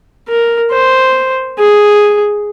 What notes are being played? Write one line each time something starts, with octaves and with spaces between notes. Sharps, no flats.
A#4
C5
G#4